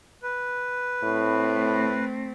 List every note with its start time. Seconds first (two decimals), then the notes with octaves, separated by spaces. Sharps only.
0.23 B4
1.03 A2 A3 C4